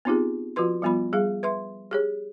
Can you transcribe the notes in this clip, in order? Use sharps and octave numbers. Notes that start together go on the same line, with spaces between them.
B3 C4 D#4 F4 G4 G#4
F3 F4 F#4 B4 C6
F3 G3 B3 F4 B5
G3 G#4 F5
B4 E5 C6
G4 G#4 C#5